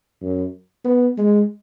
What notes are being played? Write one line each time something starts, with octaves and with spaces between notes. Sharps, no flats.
F#2
B3
G#3